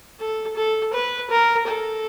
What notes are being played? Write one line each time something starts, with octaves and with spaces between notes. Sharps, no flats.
A4
A4
B4
A#4
A4